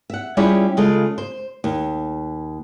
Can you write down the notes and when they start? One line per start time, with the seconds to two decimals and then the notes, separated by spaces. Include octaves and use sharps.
0.10 E5 F#5
0.37 G3 C#4 E4 F4 G4 G#4
0.77 C#3 G#3 F4 A4
1.18 C5
1.64 D#2